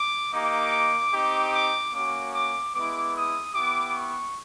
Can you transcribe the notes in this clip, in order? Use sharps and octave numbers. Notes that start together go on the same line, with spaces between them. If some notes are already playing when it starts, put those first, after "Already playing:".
Already playing: D6
A#3 D#4 G4 D6
C4 D#4 G4
D6
A#3 C#4 F#4 D6
D6
G#3 B3 E4 D6
D#6
B3 E4 G4 D6
C#6